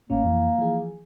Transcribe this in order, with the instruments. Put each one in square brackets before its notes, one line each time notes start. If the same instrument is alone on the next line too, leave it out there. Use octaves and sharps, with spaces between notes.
[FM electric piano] G#1 A2 C#4 [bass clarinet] A#3
[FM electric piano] F2 E3
E3 F3 G#4